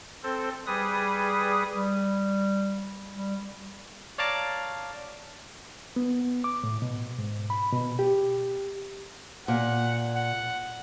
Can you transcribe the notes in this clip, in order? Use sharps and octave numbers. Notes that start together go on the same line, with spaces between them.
C4 A4 C5
G3 G#4 B4 D#6
G3
G3
C#5 D5 F5 A5 A#5 D6
B3
D6
A2
B2
G#2
B5
B2
G4
A#2 F#5
F#5